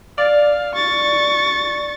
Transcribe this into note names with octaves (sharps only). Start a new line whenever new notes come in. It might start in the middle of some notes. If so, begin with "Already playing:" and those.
D5 F5
C#6 A6